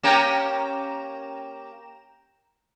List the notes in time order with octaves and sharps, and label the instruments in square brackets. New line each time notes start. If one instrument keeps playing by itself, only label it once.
[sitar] A#3 C#4 G4 [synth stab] G5 A#5 E7